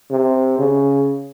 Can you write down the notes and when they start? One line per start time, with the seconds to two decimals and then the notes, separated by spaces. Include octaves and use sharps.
0.11 C3
0.58 C#3